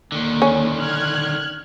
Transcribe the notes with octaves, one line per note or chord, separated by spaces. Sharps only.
D#2 D3 D#3
C#4
F6 F#6 G#6